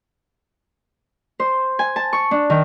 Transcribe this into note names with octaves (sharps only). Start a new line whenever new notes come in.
C5
G#5
A5
C#6
D4
D#3